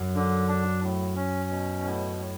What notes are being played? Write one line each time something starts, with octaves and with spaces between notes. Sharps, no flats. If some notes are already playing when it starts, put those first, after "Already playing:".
Already playing: F#2
D3
D4
A2
C#4
B2
A2
A2